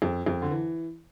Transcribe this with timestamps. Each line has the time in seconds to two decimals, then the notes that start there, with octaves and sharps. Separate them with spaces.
0.02 F2
0.26 F2
0.42 D3
0.51 E3